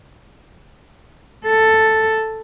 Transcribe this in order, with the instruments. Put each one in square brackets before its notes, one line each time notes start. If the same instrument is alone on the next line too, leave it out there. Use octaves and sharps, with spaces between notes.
[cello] A4